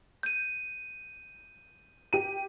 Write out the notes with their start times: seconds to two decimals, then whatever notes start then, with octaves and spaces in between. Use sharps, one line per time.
0.23 G6 D#7
2.13 G4 D#7